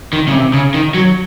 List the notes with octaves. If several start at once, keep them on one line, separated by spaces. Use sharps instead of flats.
D#3
C#3
C3
C#3
D#3
F#3